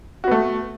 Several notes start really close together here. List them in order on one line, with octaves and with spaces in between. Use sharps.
F#4 B3 A3